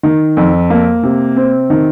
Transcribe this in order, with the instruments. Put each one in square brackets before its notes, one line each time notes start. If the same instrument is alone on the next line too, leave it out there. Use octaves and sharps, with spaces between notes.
[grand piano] D#3
F2
A#3
C3
C4
D#3